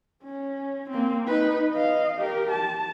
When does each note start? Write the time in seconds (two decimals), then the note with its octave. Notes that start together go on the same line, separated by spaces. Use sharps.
0.23 C#4
0.90 A#3 C4
1.27 D#4 B4
1.72 D#5 F5
2.18 G4 A#4
2.51 A5